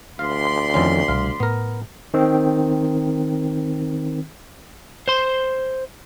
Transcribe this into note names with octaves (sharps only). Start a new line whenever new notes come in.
D2 D5 F5 B5 C6
F2 D#3 C#4
C2 B2 G3 F5
A2 B3 A#4
D#3 C4
C5 C6